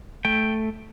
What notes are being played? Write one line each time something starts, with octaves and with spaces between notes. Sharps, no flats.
A3 G5